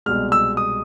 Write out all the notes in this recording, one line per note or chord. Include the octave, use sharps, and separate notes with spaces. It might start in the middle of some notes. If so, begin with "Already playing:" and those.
C2 B2 G#3 F6
E6
D#6